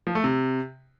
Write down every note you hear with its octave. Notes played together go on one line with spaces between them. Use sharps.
F3
A3
C3